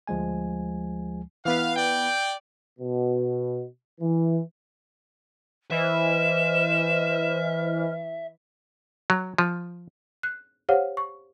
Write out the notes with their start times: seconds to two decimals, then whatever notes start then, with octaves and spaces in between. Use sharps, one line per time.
0.07 D2 F3 G#3 G#5
1.45 E3 B3 B4 F5
1.76 D5 G5
2.80 B2
4.00 E3
5.71 E3 C5 D#5 E5 F6 E7
9.10 F#3
9.38 F3
10.23 F#6
10.69 G4 C5 C#5 F5 F#5
10.97 C#6